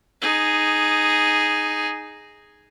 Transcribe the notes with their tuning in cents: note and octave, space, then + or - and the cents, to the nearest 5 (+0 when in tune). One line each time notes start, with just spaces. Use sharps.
D#4 -5 G#4 +0